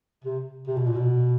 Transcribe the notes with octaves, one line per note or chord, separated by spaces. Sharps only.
C3
C3
B2
A#2
B2